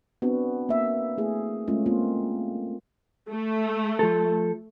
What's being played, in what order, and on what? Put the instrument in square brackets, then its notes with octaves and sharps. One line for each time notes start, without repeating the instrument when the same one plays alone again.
[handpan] B3 C4 D4 F#4
A#3 E5
A3 E4 G#4
G#3 A3 C#4 F4
A#3 C4 F4
[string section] A3
[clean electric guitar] F3 A4